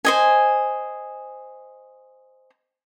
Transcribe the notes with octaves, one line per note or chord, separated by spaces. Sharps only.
C5 D#5 G#5